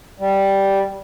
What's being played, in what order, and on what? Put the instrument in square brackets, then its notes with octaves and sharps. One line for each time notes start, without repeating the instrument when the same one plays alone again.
[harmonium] G3